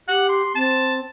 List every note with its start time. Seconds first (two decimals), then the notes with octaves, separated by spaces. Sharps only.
0.08 G4 F#5
0.29 C6
0.55 C4 A5